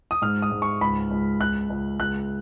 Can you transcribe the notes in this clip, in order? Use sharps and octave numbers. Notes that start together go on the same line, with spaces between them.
D#6
G#2 F6
D#6
G#2
C#6
C#2 B5
C#2
C#2 F#6
C#2
C#2 F#6